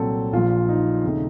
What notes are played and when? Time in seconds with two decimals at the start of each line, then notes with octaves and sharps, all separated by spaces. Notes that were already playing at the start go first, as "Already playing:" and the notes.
Already playing: C2 A#2 F#3 C4 A4
0.33 A#1 A#2 F3 F4
0.69 D#4
1.03 D#2 C#3 A3 C4